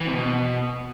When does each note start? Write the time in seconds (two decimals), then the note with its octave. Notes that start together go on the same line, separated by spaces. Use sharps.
0.01 E3
0.07 C3
0.13 B2